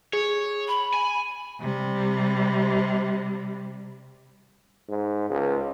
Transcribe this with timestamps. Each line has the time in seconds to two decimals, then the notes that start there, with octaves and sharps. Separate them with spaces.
0.13 G#4 C#5
0.67 B5
0.94 G#5
1.61 C3 G3
4.89 G#2
5.30 C#2